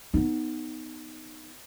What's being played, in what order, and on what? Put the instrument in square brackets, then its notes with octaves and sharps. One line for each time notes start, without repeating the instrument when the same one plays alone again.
[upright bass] B3 D#4